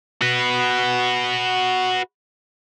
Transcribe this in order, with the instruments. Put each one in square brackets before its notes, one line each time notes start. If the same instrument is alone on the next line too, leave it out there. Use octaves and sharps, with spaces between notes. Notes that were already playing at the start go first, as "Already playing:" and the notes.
[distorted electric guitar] F#4 B4